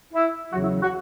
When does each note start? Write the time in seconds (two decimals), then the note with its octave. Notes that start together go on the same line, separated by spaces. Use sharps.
0.13 E4
0.52 E2 C#3 F#3 F#4
0.63 E4
0.82 F#4